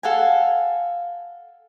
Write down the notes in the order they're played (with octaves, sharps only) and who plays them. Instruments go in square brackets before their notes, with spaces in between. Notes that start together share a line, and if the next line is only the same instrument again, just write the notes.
[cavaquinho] A4 F5 F#5 G#5